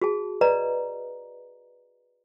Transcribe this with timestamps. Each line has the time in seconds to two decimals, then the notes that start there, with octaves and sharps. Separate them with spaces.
0.02 F#4 G#4 A5
0.41 B4 D5 D#5 A#5